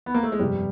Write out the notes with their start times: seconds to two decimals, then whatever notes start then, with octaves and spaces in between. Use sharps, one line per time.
0.06 B3
0.14 A#3
0.23 A3
0.32 G#3
0.39 G1 F2 C3 G3